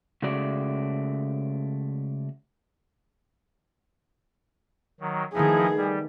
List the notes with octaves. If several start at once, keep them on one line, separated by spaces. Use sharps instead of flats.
C#3 G#3 A3 F#4 D5
D#3 F#3
D#3 F3 A3 B3 D#4 E4 G#4
G3